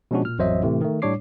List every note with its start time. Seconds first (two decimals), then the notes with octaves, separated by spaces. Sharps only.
0.11 B2 F3 G#3 C#4 D4 F#4
0.22 A#2 F6
0.39 A1 F2 F#3 C5 D#5 E5
0.62 A2 C3 E3 A3
0.81 D#3 A3
1.02 A2 G3 D4 C#5 D6 C7